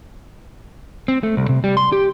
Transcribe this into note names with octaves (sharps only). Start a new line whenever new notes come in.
C4
A3
C2
C3
G3
C6
G4